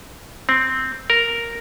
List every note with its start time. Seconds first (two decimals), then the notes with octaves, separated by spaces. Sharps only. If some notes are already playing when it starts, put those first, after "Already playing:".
0.49 C4
1.10 A#4